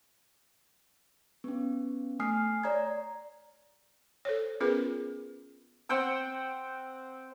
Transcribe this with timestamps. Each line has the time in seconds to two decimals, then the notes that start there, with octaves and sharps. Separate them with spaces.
1.44 B3 C#4
2.19 A3 G#5 D#6 F6 C7
2.64 C#5 D5 A#5 G#6
4.25 A4 C5 C#5
4.60 B3 C#4 F4 G#4 A#4 B4
5.89 C4 F#5 G5 E6